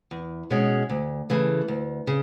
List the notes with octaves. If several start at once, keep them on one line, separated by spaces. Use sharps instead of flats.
E2
B2 G#3 C#4
D2
C#3 E3 A3
D2
C#3